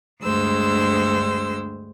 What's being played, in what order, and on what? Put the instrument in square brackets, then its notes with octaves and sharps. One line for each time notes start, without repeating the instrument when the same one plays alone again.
[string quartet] D2 G2 G#3 C5 E6